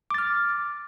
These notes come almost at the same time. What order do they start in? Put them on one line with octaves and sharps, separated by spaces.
D6 A6 F6